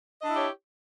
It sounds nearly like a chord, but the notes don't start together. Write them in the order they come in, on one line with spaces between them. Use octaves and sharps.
D#5 D4 E4 G4 C#5